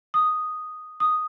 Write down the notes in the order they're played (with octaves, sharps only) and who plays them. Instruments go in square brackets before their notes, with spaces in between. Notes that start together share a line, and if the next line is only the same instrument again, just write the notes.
[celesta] D#6
D#6